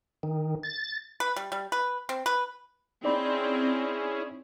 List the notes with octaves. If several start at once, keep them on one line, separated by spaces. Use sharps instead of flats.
D#3
A6
B4
G3
G3
B4
C4
B4
C4 C#4 D#4 E4 G#4 D5 B5